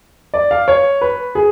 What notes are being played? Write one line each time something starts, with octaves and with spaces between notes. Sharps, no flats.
D5
F5
C#5
B4
G#4